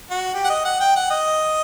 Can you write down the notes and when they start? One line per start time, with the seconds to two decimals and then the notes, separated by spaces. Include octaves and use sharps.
0.11 F#4
0.34 G4
0.44 F#5
0.49 D#5
0.65 F#5
0.80 G5
0.96 F#5
1.10 D#5